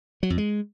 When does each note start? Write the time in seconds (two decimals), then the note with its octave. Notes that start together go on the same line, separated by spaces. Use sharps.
0.23 F#3
0.30 F2
0.38 G#3